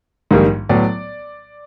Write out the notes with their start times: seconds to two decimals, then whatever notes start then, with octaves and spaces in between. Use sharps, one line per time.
0.31 A#1 G#2 D#3 G3 A#3
0.69 A2 F#3 B3 D5